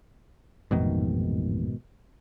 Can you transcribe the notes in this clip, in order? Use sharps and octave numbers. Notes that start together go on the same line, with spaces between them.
A1 F2 G#2 B2 D#3 A3